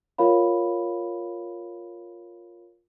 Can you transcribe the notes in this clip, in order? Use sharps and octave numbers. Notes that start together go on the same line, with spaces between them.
F4 A#4 C#5 F5 B5